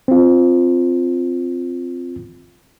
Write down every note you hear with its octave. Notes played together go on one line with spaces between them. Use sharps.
C4 F4